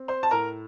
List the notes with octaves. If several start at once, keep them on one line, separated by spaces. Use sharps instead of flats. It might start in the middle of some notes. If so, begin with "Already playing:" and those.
Already playing: C4
C5 C6
A5
A2 A#4 A#5